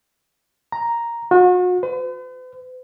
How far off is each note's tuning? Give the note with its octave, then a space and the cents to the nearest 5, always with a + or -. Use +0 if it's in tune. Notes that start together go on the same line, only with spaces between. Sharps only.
A#5 +0
F#4 -40
B4 +45